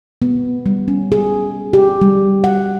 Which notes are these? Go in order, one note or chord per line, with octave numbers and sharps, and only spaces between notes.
B3
G3
C#4
G#4
G4
G3
F#5